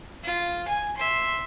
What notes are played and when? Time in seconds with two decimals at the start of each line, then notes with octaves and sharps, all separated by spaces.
0.24 F4
0.68 G#5
0.97 E5 C6